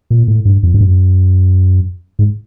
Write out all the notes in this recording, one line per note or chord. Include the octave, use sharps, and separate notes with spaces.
A#2
A2
G2
F2
G2
F#2
G#2